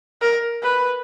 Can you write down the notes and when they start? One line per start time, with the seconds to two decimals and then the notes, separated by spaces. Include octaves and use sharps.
0.22 A#4
0.63 B4